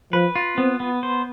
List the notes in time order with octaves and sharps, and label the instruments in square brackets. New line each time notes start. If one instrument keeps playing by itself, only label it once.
[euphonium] F3 [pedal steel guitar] B4
[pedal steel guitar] F4
[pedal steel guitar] B3 [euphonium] C4
[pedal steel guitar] B3
C5